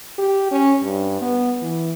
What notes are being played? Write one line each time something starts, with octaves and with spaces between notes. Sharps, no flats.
G4
C#4
G2
B3
E3